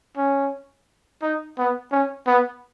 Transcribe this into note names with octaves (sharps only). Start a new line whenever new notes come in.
C#4
D#4
B3
C#4
B3